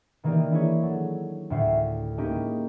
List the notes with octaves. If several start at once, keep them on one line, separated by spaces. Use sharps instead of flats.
D#3 E3 A#3 D#4 G4 D5
D4 E4 G#4 C#5
F#3 A4
D2 A2 F#4 E5 G5 C7
G#3 A#3 C#4 D#4 E4 G4